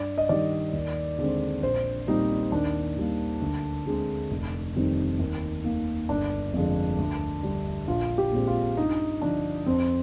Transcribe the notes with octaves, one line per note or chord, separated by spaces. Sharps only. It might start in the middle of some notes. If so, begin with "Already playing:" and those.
Already playing: G2 D5
D#5
D#3 G3 D5
D#2
D3 G#3 C4
A#1 C5
A#2 G3 C4 D#4
D#2 D4
D#3 G3 A#3
D2
D3 G#3 C4
F1
F2 D#3 G3 C4
D#2
D#3 A#3
G1 D4
F2 D3 F3 G#3
D2
D3 G3
A#1 F4
G4
A#2 G#3 C4
F4
G2 D#4
D3 F3 D4
F2 C4